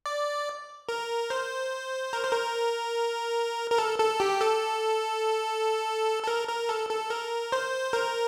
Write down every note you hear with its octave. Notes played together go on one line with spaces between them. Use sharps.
D5
A#4
C5
A#4
C5
A#4
A#4
A4
A4
G4
A4
A4
A#4
A#4
A4
A4
A#4
C5
A#4